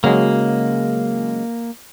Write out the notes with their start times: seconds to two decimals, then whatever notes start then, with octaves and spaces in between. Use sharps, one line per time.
0.04 C#3 F#3 G#3 A#3